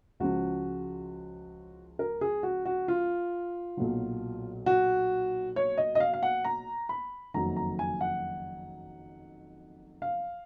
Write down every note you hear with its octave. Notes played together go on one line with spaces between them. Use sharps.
C#2 C#3 F3 F#4
A#4
G#4
F#4
F#4
F4
B1 A#2 F#3
F#4
C#5
D#5
D#5
F5
F5
F#5
A#5
B5
F#1 F2 D#3 F#3 A#5
A#5
G#5
F#5
F5